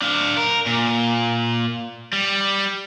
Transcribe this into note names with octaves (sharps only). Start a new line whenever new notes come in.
D4 F5
A#4
A#2
G3